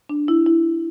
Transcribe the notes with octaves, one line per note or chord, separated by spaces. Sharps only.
D4
E4
E4